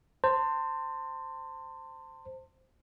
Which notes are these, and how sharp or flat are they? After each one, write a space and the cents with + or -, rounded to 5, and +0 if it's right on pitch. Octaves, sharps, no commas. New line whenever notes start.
C5 +0 A5 +35